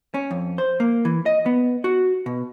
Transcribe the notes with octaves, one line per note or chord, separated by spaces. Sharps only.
C#4
F2
C5
A#3
E3
D#5
B3
F#4
B2